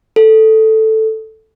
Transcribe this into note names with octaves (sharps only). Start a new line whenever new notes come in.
A4